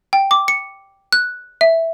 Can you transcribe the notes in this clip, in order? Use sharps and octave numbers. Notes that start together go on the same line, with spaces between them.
G5
D6
C#7
F#6
E5